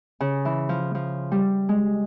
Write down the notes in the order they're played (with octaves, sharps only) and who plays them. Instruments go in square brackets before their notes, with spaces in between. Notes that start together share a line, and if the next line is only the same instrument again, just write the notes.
[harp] C#3
E3
F3
F3
G3
G#3